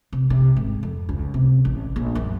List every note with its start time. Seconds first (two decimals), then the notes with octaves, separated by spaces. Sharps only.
0.13 C3
0.30 C3
0.57 G#1
0.83 F2
1.09 C#2
1.34 C3
1.65 A1
1.96 A#1
2.15 F#2